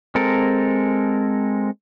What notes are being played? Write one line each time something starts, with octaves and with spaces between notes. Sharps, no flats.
G#3 C4 A4 A#4